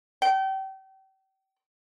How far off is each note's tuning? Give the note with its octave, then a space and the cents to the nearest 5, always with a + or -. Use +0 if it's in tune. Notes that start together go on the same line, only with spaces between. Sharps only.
G5 -35